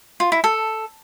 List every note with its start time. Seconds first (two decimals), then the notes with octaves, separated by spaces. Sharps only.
0.20 F4
0.32 E4
0.44 A4